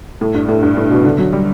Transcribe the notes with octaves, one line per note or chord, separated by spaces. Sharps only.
A2
G2
A2
G2
A2
B2
D3
F#3
G3